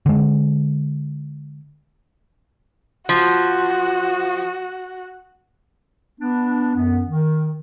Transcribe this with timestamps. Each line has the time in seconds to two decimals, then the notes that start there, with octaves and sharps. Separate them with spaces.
0.06 D3 G#3
3.09 F3 F#4
6.21 B3 D4
6.75 F#2 B3
7.08 D#3